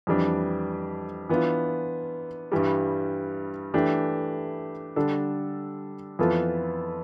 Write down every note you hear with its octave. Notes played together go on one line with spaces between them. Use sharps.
F2 E3 G3 D4
E3 B3 D4 F4
G2 E3 G3
E3 A3 D4 G4
D3 G3 D4 A4
F2 E3 B3 F4 A4